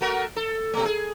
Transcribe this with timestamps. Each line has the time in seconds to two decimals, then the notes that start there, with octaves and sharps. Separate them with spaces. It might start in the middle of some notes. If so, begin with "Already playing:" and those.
0.01 A3 F#4 A#4
0.36 A4
0.74 B2 A3
0.85 G#4